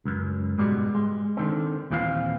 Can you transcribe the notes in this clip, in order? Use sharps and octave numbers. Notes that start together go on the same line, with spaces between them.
C#2 F#2
G#2 B2 G3 G#3
G#3
D3 D#3 C4
D#2 A#2 E3 C4 F5